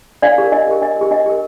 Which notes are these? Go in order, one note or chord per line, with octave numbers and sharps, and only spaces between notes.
D4 D5 F5
G4 A#4
D4 D#5
G4 A#4
D4 D#5
G4 A#4
D4 D#5
G4 A#4